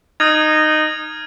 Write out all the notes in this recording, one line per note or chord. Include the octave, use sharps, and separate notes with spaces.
D#4 D#6 F6 G#6